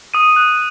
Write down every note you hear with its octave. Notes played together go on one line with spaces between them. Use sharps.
D#6 D#7
F#6